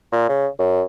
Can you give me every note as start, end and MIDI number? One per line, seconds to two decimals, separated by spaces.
0.12 0.28 46
0.29 0.47 49
0.59 0.83 42